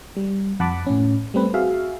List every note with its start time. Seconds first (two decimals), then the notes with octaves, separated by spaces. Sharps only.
0.17 G3
0.60 F2 F#5 A5 B5 D6
0.87 A2 C#4
1.34 G3 A3 C4 B4
1.54 F#4 G#4 E5 F5